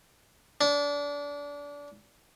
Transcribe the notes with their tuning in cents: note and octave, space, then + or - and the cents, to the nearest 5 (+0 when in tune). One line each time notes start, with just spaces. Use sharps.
D4 -25